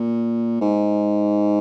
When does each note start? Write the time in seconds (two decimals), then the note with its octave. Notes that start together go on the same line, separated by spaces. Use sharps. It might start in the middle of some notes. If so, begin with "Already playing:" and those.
Already playing: A#2
0.61 G#2